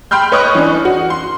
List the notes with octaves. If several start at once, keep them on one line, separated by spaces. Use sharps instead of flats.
G5 B5 C6 F6 G6
B4 C#5 D#5 C#6 D#6 F#6
E3 C#4 D4
F#4
C6